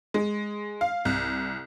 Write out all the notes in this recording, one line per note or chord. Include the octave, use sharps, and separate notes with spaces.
G#3
F5
C2